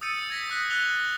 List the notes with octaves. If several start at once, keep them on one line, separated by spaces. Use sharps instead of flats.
D#6 E6 G6 A6 C#7 D#7
G#6 A#6 B6
D#6 F#6 G#6 B6
F#6 A6 F7 G7